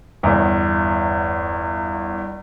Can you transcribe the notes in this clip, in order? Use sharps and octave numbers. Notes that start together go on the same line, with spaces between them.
G1 E2